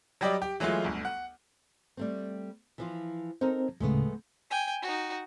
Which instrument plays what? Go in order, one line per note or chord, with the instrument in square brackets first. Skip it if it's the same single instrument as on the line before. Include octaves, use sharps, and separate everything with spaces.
[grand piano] F#3 G3 G4 D5 D#5
G4
E3 F#3 G#3 A3 F4
G1 D2
F#5
[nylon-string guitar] G3 A3 C4
E3 F3 F4
[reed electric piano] C4 C5 [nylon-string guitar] D#4 A4 A#4
[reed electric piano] D2 A2 C#3 [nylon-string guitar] G#3 A3 B3
[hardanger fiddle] G5 G#5
D#4 F#4